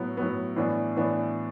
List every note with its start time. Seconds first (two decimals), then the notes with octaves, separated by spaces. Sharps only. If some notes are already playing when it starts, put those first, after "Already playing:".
Already playing: A2 F#3 B3
0.17 A2 F#3 B3
0.56 A2 E3 B3 D4
0.96 A2 E3 B3 D4